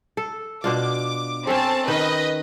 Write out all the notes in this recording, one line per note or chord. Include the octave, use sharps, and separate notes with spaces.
A4
B2 D4 F4 D6
C4 C#4 A4 A5
D#3 D#4 B4 D#5